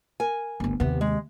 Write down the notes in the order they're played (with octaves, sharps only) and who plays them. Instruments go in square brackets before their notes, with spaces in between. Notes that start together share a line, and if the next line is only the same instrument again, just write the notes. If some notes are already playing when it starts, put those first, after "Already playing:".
[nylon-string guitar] A#4 G#5
[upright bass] G1 D2
[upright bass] D#2 C3 [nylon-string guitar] B3
[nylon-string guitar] G#3